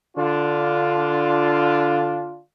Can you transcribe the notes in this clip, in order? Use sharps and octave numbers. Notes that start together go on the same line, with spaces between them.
D3 D4 F4